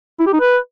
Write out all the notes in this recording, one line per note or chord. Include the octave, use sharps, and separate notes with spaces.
E4
G4
D#4
B4